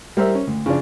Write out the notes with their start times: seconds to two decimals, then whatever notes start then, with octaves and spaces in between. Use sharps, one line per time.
0.17 G3 A#4 C5 E5
0.35 C#4
0.47 D2
0.66 C#3 F3 D4